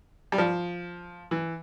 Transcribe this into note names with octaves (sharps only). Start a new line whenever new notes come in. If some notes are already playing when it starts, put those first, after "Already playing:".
G3
F3
E3